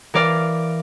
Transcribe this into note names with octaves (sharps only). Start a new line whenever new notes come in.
E3 A#4 D5 F5